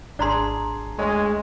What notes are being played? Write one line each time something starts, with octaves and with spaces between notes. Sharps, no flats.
G#1 D4 G#4 D5 A#5 C6
D2 G#3 C#5